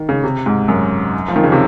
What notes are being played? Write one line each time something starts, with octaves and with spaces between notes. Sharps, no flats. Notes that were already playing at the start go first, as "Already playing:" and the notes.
Already playing: D#3
C#3
C3
G#2
F#2
F3
D#3
C#3
C3